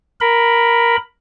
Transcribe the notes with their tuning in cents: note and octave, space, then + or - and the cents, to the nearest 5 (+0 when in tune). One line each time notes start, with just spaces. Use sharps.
A#4 +5 B5 +0